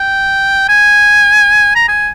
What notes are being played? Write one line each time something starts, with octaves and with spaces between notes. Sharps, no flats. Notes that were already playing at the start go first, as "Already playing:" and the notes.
Already playing: G5
G#5
A#5
G#5